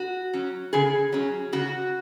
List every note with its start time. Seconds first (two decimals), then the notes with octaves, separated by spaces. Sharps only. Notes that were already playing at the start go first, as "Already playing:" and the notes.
Already playing: F#4
0.33 F#3 C#4
0.73 C#3 G#4
1.12 F#3 C#4
1.53 C#3 F#4